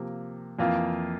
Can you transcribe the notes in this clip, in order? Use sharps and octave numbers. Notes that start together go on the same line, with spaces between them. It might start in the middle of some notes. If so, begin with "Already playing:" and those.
Already playing: C3 F3 A#3
F2 E3 A#3 F4